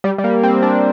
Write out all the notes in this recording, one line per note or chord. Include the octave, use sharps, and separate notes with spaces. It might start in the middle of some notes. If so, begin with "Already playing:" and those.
G3
G3
A#3
C4
D4